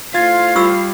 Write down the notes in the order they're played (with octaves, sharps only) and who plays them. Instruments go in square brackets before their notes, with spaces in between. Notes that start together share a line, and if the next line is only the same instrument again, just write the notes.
[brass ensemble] A3 E4 C5 [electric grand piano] F4 G#6 A6 [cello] F5
[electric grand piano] G3 [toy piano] F4 C#6 E6